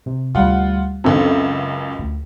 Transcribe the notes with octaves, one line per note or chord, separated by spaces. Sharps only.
C3
D2 G3 F4 F#5
C#2 F#2 C4 D4 A4
E5
D2